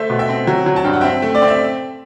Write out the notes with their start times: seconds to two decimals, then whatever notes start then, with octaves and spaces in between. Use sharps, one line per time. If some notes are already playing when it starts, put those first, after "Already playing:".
Already playing: A3 C5 E5
0.10 B2
0.19 E5 G5
0.29 C4
0.47 F#3
0.66 F#3
0.76 A5
0.84 G2 G5
0.93 F#5
1.01 C4 E5 G5
1.22 A3
1.35 D5
1.42 C4
1.48 E5